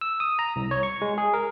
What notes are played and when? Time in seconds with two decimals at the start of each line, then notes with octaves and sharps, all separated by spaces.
0.01 E6
0.20 D#6
0.39 A#5
0.56 C2
0.71 C#5
0.83 C#6
1.02 G#3
1.18 G#4
1.34 A#4